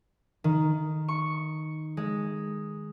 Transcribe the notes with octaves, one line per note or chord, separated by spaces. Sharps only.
D#3
C#6
G#3